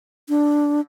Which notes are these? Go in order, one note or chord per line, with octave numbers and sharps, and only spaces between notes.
D4